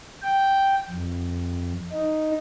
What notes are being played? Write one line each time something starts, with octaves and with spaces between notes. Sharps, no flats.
G5
F2
D#4